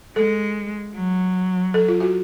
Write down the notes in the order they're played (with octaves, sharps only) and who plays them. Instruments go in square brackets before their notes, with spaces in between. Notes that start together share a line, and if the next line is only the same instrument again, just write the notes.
[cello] G#3 [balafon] A4
[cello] F#3
[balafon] A4
F4
F#4